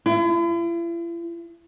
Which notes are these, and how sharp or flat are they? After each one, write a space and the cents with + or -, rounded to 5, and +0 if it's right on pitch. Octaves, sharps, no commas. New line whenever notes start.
E4 +45